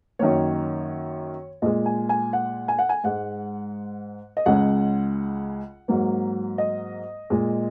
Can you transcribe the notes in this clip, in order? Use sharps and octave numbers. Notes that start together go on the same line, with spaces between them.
F#2 D#3 A#3 C#5
A#2 G#3 D#5
G#5
G#5
F#5
G#5
F#5
G#5
G#2 G#3 F#5
D#5
C#2 C#3 G#3 F#5
G#2 F#3 A#3
D#5
A#2 G#3